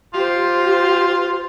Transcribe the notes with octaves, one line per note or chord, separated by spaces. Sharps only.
F4 G4 C5